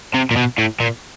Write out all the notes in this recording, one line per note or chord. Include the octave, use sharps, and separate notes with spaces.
C3
A#2
B2
A2
A#2